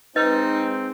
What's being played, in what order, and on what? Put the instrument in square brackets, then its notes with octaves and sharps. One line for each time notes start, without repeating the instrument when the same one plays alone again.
[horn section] G#3 C4 [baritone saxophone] D#4 [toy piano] B4 D#5